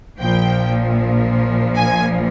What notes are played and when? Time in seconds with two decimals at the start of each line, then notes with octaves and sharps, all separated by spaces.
0.19 A#1 A#2 F3 G5
1.76 G#5